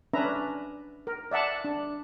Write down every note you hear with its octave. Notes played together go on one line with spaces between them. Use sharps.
C#4 D4 B4 E5 A#5
A#4
D5 E5 F#5 A5
D4